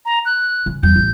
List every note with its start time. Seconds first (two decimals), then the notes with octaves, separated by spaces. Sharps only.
0.05 A#5
0.25 F#6
0.66 C#3
0.83 E2 G3 G6
0.96 A1